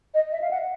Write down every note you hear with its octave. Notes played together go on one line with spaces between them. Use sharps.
D#5
E5
F5
F#5